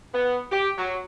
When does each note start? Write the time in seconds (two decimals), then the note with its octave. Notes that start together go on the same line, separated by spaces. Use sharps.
0.14 B3
0.51 G4
0.77 F#3